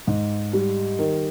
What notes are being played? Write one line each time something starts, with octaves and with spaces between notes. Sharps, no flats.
G#2
G3
D#3